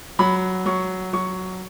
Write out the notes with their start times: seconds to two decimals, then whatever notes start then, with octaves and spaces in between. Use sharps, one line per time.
0.19 F#3 B5
0.66 F#3 C#6
1.13 F#3 C#6